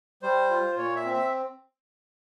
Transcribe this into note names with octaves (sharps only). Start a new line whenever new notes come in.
G3 C5
F4
A#2 C#5
E5
C4
E5